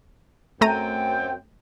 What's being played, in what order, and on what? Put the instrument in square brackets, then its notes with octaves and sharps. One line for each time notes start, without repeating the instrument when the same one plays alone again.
[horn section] F#2 C4 G5 [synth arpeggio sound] A3 A#5 D#7